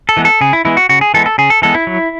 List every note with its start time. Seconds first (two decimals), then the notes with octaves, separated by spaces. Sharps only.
0.09 A4
0.17 E3 G#3 B3
0.25 A4
0.41 C#3 G#4
0.53 E4
0.65 E3 G#3 B3 E4
0.77 F#4
0.89 C#3 F#4
1.01 G#4
1.14 E3 G#3 B3 A4
1.26 A4
1.38 C#3 G#4
1.50 A4
1.62 E3 G#3 B3 A4
1.75 E4
1.87 F#3